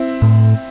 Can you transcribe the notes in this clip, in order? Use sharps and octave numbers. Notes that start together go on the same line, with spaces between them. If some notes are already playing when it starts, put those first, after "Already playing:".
Already playing: C4 E4
A2